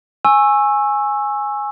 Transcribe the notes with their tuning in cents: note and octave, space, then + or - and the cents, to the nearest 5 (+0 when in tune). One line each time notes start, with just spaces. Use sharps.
G#5 +0 C#6 -25 E6 +0